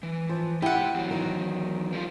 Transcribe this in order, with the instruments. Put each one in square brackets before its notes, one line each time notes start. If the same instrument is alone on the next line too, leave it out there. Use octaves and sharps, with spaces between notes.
[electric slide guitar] E3
[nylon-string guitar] F3
[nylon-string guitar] E4 [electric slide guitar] G4 E5 [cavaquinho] F#5 G5
[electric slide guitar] E2 F#3
[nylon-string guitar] D#3
[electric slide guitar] F3 G3 F4